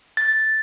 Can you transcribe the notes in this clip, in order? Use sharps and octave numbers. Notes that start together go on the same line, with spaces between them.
A6